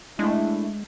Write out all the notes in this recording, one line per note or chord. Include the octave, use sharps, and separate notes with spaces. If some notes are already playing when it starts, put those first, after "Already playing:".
G#3 A3 D4 E4